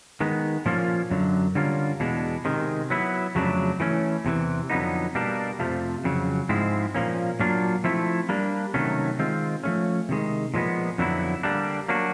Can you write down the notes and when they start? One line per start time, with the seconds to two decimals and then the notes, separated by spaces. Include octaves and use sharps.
0.20 D#3 G#3 B3
0.66 A#2 F3 A#3 C#4 F4
1.11 F#2 D3 F#3
1.55 D3 G3 A#3 C#4 F4
2.00 E2 B2 G#3 B3 D4
2.45 C3 D#3 G#3
2.90 F#3 B3 E4
3.35 F2 C#3 F#3 A3 D4
3.80 E3 A3 C#4
4.25 E2 C3 E3
4.70 F2 D3 F#3 B3 D#4
5.15 B2 G3 A#3 D4
5.59 F2 C3 F3 A3
6.04 F2 C#3 F#3
6.49 G#2 F3 G#3 C4 E4
6.95 A#2 F3 A#3 C#4
7.40 A#2 F#3 A#3 D4 F4
7.84 F3 A3 C4 E4
8.29 G3 A#3 D4
8.74 C3 D#3 F#3 A3 C#4
9.19 D#3 G#3 C4 F4
9.64 F3 A3 C#4
10.09 C3 D#3 G#3
10.54 A#2 F3 G#3 B3
10.98 F2 D3 F#3 B3 E4
11.43 D3 G3 A#3 D4
11.89 F#3 A#3 D4 F#4